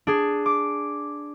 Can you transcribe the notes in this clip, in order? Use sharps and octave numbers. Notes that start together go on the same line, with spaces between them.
D4 G#4
D6